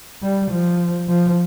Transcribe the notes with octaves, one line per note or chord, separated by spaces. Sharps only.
G3
F3
F3